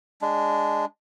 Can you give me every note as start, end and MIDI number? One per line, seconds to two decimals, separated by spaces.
0.22 0.85 56
0.22 0.85 62